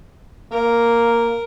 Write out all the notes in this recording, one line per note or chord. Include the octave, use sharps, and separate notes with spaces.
A#3 A#4